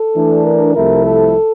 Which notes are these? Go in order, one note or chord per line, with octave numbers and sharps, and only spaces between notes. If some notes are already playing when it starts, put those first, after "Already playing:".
Already playing: A4
E3 A3 D4
A#4
C2 C3 F3 A3 E4 A#4
A4